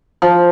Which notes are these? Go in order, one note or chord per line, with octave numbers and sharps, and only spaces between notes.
F3